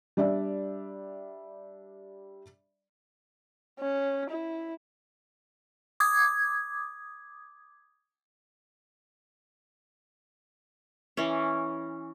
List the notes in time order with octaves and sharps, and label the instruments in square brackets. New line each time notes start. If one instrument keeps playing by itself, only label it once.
[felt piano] G3 D4 D5 E5
[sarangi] C#4
E4
[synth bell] D6 D#6 G#6
[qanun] E3 C#4